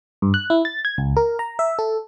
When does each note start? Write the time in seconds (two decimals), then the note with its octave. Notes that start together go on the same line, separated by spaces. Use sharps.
0.22 G2
0.34 F#6
0.50 E4
0.65 A6
0.85 G#6
0.98 C#2
1.17 A#4
1.39 A#5
1.59 E5
1.79 A4